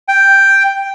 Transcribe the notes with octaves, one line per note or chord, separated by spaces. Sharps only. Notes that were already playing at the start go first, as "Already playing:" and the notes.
G5